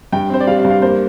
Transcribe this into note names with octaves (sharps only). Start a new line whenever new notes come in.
G2 G5
C4 C5
D5
G3 F5
F5
G2
F5
A#3 C5